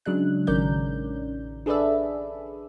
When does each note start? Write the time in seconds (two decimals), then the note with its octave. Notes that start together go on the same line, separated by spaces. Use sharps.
0.05 C#3 F#3 G#3 D4 F#6
0.47 A1 D#3 C#4 A#4 D5 G6
1.66 D4 G#4 A4 B4 D5 E5